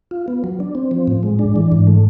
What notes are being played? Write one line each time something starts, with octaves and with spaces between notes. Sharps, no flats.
F4
B3
F#3
D4
C4
F3
A2
G#3
D4
E3
G#2
A3